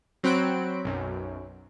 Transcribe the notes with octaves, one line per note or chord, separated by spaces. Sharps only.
F#3 C4 B5 F#6 D7
B1 F#2